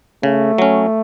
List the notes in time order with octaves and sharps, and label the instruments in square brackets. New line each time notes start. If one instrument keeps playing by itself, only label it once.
[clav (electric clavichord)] C#3 [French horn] A3
[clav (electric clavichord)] F#3 C#4